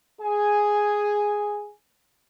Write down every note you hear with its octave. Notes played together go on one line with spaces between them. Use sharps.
G#4 G#5